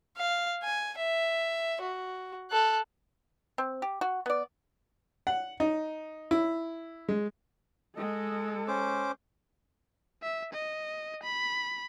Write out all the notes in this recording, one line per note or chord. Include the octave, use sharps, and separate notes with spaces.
F5
G#5
E5
F#4
A4 F#6
C4
G4
F#4
B3 D5
F#5
D#4
E4
G#3
G#3 A4 D#5
C#4 C5 D6
E5
D#5
B5